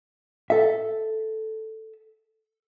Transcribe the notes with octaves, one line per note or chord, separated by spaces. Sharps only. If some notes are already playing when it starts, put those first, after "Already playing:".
A4 E5